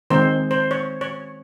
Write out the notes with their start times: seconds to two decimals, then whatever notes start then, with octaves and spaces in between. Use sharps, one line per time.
0.10 D#3 G#3 C4 C5
0.51 C5
0.71 C#5
1.01 C#5